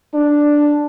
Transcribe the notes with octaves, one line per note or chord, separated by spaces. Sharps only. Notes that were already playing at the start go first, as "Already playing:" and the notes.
D4